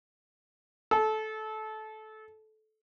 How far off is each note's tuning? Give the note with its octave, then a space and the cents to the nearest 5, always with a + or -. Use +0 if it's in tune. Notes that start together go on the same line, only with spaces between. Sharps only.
A4 -20